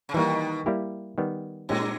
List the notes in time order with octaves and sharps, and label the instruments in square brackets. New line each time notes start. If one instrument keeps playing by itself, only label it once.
[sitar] C#3
[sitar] B2 D#3 [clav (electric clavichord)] E3 G3 A#3
[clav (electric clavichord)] G3 A#3 E4 G4
D#3 G3 B3
[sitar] G2 [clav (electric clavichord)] A#2 G#3 C#4 G4